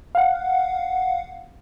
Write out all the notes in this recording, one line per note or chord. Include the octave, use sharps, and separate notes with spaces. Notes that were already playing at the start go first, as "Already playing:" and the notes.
F5 F#5